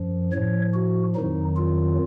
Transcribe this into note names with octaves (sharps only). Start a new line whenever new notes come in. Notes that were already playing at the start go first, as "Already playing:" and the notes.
Already playing: F#2 F3
A2 F3 C#5
F#4
F2 D#3 F#3 D#4
F4